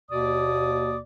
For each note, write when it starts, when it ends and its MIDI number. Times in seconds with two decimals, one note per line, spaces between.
0.10 0.97 39
0.10 0.97 47
0.10 0.97 58
0.10 0.97 74
0.10 0.97 86
0.10 0.97 87